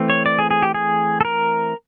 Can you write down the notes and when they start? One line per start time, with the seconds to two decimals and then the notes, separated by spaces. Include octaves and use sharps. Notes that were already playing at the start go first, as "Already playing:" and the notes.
Already playing: E3 A3 C4
0.10 C#5
0.26 D5
0.39 G#4
0.51 G#4
0.62 G4
0.74 G#4
1.21 A4
1.25 A#4